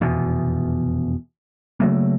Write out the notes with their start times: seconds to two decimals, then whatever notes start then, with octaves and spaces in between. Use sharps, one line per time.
0.01 F1 E2 B2
1.80 C#3 F#3 A3 A#3